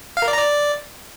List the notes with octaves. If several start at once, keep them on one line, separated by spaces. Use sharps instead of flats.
F5
A#4
D5
A#5
D5